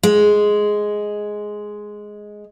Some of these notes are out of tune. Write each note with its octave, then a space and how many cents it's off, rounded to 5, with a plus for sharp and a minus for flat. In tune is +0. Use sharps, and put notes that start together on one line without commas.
G#3 +5